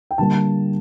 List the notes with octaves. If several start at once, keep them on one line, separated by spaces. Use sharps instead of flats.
G5
D3 G3 A#3 A5